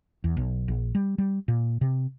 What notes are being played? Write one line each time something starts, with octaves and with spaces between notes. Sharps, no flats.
E2
B1
A#1
G3
G3
A#2
C3